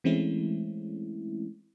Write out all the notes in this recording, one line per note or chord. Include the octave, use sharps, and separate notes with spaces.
E3 G#3 A3 C4 C#4 E4